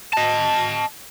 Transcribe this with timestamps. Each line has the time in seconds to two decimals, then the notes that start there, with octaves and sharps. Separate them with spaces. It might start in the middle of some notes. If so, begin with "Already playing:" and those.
0.13 D#5 A5